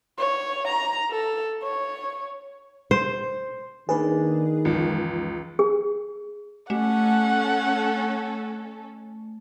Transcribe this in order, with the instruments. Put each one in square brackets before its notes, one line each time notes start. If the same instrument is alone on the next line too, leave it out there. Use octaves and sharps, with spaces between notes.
[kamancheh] C#5
A#5
A4
C#5
[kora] C5
[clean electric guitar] D#2 A#3 D4 [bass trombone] D#3 [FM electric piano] G#4 B4
[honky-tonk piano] C#2 [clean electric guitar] F#2 E3 F3
[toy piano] G#4
[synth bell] A3 [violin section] C#4 A4 [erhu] F#5